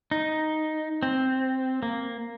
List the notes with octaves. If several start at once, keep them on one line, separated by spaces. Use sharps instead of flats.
D#4
C4
A#3